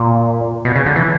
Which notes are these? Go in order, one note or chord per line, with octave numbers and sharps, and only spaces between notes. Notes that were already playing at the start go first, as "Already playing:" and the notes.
Already playing: A#2
B2
C#3
D3
E3